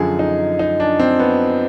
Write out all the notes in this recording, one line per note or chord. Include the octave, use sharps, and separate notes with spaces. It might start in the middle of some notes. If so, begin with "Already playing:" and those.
Already playing: F#2 D3 F3 G#4
D#4
D#4
D4
C4
B3